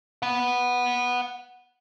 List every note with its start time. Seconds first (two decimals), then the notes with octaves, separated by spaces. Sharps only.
0.22 F#5 B5